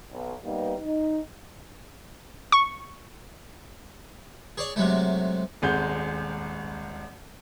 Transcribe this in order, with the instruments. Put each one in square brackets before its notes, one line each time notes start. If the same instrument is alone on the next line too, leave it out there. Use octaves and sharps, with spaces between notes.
[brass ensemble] B1
G3 A#3 B3 D#4 B4
D#4
[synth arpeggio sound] C#6
[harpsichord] G#4 C#5 D5
C3 F#3 G#3 A3
[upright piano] D#1 G#1 G#3 G6